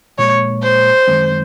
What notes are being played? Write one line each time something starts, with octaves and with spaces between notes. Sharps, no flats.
A#2 F3 G#3 C#5
C5
F#2 D#3 G#3 C4